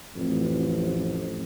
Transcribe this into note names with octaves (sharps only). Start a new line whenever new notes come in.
A1 F2